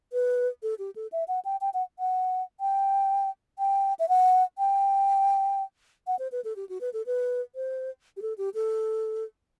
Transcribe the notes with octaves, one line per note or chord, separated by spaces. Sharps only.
B4
A4
G4
A4
E5
F#5
G5
G5
F#5
F#5
G5
G5
E5
F#5
G5
F#5
C5
B4
A4
G4
F#4
B4
A4
B4
C5
G4
A4
G4
A4